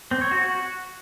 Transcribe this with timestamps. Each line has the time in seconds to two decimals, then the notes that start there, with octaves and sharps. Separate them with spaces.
0.11 C4
0.21 C#5
0.31 F#4
0.41 F#4